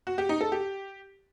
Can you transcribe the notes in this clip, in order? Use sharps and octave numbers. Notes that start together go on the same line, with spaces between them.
F#4
G4
D#4
A4
G4